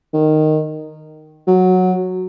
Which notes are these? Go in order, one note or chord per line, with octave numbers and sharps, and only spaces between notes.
D#3
F#3